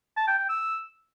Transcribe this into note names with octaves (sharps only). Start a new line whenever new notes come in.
A5
G5
G5
E6